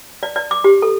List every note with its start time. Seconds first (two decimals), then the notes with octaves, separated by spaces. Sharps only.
0.23 D5
0.36 D5
0.51 D6
0.64 G4
0.82 A4